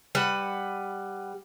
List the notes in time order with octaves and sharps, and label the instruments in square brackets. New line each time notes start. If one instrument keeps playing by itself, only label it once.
[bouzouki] G3 B4 F#5